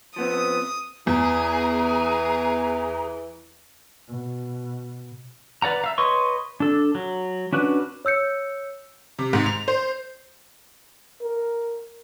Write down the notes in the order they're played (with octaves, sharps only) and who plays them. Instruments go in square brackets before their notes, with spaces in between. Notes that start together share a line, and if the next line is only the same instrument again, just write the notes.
[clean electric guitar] F3 B3 C4 [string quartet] D#6
[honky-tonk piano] E2 [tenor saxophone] E3 [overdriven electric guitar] G#4 [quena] A#5
[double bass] B2
[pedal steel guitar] B4 D5 F#5 A#5
E5 F5 A#5
B4 C#5 D#5 C6 C#6
D4 A4
F#3
C#4 D4 F#4 B4
[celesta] C#5 E6 G6 C#7
[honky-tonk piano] C3
G#2
F7
C5
[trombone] A#4